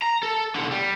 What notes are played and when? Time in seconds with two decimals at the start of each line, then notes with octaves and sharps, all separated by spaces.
0.02 A#5
0.23 A4
0.55 B1 D3
0.71 G3